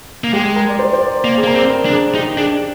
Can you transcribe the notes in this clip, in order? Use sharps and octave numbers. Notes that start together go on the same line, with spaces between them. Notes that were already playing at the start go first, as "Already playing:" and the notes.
A#3
G#3 G4
A#4
D5
C5
C5
D5
A#3
G#4
A#3 A#4
C4
A#4
D4
G#4
D#4 G4
D4 G#4